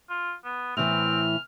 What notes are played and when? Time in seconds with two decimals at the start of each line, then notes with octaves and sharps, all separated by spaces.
0.10 F4
0.44 B3
0.77 A2 E3 C4 F6